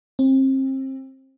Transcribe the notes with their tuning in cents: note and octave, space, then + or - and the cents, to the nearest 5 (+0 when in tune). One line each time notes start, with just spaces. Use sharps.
C4 +30